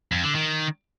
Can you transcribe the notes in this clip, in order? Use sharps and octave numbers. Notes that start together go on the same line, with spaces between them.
F2
D3
D#3